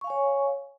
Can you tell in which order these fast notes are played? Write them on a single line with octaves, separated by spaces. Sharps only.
C#6 F5 G#5 C#5